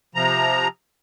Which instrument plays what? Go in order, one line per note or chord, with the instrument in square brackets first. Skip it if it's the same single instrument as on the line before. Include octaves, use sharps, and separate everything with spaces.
[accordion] C3 F3 A#5